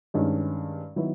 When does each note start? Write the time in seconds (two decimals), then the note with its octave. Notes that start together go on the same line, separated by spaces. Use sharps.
0.14 G2 D#3 G#3 C#4
0.96 D#3 F#3 B3 E4